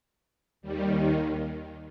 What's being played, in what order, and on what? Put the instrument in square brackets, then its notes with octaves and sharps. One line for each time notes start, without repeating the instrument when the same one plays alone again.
[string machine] D#2 D#3 G3